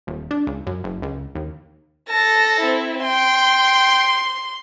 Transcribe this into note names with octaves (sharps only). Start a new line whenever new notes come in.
D#1
D4
C#2
F#2
F#1
C#2
D#2
A4 A5 A#6
C4 E4
G5 C6